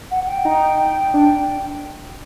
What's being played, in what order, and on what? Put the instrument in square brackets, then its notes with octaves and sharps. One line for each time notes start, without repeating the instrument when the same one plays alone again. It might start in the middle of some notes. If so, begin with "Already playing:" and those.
[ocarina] F#5
F#5
G5
[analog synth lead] D#4
D4